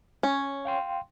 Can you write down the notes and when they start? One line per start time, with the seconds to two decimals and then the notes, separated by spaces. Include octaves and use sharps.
0.23 C#4
0.65 F5 G5 C6